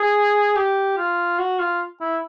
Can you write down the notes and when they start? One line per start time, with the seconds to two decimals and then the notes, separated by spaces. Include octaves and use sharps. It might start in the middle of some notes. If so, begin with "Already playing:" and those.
Already playing: G#4
0.56 G4
0.97 F4
1.39 F#4
1.59 F4
2.01 E4